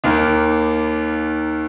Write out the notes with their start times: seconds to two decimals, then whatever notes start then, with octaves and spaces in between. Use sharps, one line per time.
0.04 D#2 D#3 A#3